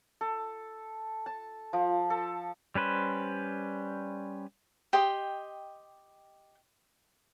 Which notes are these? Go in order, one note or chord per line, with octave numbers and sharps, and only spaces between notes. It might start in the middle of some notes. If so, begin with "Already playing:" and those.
A4
A5
F3
A4
G3 C#4 B4 C5
G4 D#5 G5 C6